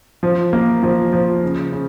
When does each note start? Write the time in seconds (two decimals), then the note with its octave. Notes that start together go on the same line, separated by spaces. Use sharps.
0.23 F3
0.53 A#3
0.83 F3
1.12 F3
1.43 C#3
1.72 C#3